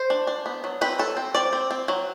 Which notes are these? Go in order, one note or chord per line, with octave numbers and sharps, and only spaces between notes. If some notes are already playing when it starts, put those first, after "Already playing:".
Already playing: C5
D4
D4
B3
F#3
C4 B4
F#3 A4
C4
C4 D5
C4
C4
F#3